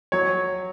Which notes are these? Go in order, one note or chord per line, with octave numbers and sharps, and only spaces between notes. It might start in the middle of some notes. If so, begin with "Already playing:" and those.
F#3 C#5